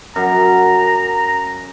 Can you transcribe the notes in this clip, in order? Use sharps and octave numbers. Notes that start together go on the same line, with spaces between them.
F#2 A#5